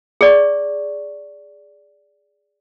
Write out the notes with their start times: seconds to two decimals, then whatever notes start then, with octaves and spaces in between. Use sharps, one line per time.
0.21 G#4 D5 C#6